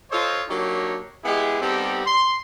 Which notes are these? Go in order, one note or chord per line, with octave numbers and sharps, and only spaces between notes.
F4 A4 C5 C#5 D#5
F#3 A#3 D4 D#4 G4 C#5
G#3 B3 E4 G4 G#4
G3 B3 C4 D#4 G4 A4
C6